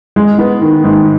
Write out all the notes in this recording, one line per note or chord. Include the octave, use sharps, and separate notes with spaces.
G#3
B3
D#3
G#2